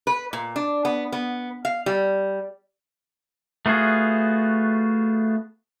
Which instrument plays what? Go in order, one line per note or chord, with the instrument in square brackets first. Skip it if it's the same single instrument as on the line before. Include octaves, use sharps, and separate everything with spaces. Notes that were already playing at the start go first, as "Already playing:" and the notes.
[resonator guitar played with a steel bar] B4
A#2
D4
B3
B3
F5
G3
[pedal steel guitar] A3 B3 F4 F#4 G#4